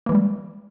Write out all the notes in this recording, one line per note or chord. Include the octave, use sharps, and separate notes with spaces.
E3 G3 G#3 A#3